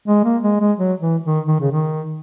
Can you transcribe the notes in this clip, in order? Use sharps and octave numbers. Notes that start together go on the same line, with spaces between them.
G#3
A#3
G#3
G#3
F#3
E3
D#3
D#3
C#3
D#3